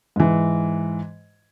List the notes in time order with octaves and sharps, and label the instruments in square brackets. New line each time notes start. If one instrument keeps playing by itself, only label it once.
[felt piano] G#2 E3